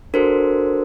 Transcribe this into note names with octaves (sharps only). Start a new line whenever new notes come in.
D4 F#4 A4 A#4 C5